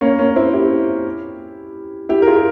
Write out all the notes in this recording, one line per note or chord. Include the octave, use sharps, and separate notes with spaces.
A#3 C#4
A#3 C#4
C4 E4
E4 G4
E4 G4
A#4
F4 G#4